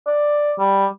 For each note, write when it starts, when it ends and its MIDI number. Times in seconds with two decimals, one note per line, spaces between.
0.07 0.53 74
0.59 0.86 55